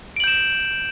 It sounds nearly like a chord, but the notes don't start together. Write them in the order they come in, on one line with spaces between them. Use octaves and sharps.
D7 F#7 G6 E7